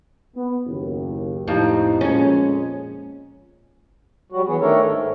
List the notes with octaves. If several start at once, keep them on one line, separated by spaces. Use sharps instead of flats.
B3
F#1 D#2
F2 A2 G3 D#4
F2 A#2 G#3 C#4
F#3 G3 F#4
E3 B3 G#4
D#3 A3 D4 A4 A#4 C#5
G#2